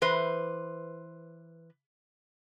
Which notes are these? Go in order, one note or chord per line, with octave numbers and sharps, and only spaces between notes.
E3 B4 C5